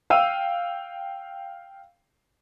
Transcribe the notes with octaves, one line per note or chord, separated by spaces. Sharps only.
F5 G5 E6 D#7